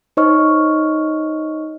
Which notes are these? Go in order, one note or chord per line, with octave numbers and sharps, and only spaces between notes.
D#4 C5 C#5 D#5 C#6 F6